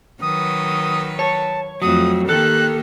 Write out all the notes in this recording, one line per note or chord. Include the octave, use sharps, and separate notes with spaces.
D#3 F#3 B4 D#6
C#5 A5
F2 F#3 A3 D#6
D#3 A#3 G4 A4 F#6